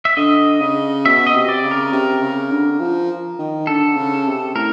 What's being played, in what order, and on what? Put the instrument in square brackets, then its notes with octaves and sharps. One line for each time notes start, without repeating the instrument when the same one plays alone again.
[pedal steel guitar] E5
[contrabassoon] D3 [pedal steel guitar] D#5
[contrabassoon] C#3
[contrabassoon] B2 [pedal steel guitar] E5
[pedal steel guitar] D#5
[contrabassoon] C3
[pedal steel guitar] D5
[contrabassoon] C#3
[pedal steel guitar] A#4
[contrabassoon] C3
C#3
D3
F3
D#3
[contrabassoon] D3 [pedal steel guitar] A4
[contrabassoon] C#3
C3
[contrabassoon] A2 [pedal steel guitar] A#4